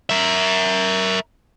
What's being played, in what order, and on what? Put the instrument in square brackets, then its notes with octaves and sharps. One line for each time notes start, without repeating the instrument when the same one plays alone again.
[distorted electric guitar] A#4 E5